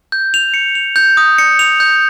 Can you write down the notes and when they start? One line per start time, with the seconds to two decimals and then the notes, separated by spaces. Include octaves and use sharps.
0.12 G6
0.34 F7
0.54 C#7
0.75 F7
0.96 G6
1.17 D#6
1.38 C#7
1.59 F7
1.80 G6